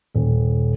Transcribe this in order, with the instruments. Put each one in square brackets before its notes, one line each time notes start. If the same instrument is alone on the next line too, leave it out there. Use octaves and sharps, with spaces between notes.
[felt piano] D#1